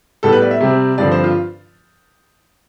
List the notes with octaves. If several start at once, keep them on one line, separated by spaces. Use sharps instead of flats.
A2 G3 B3 A4
B4
D5
E5
C3 G3 C4
G2 D3 F3 C4 D5
C5
F4